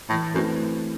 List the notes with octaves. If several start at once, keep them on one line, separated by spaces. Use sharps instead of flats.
A2 E3
F#2 A3 C4 E4 B4